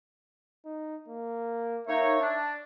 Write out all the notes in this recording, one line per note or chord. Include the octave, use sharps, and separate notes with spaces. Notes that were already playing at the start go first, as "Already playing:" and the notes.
D#4
A#3
A#3 D#4 C#5 E5
D4